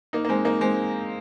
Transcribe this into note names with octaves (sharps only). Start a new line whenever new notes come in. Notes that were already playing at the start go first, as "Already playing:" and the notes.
A#3 D#4
A#3
G#3 C4
A#3 D#4
G#3 C4